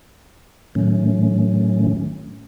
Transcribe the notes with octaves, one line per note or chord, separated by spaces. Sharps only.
A2 D#3 F#3 A3 C#4